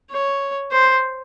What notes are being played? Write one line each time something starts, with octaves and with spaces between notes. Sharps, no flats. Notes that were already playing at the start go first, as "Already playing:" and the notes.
C#5
C5